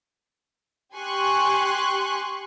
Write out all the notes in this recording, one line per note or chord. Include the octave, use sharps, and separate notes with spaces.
G4 G#5 C6 C#6 F#6